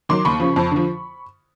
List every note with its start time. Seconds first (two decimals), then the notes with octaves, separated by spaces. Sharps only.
0.09 D#3 F#3 C6 D6
0.25 D#2 B5 C#6
0.40 C#3 F3
0.56 F2
0.71 D3 F3